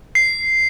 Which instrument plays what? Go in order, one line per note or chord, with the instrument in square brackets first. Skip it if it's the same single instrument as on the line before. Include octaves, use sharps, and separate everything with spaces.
[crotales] C7